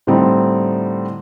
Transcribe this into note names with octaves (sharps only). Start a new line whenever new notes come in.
A2 D3 G3 C4 D#4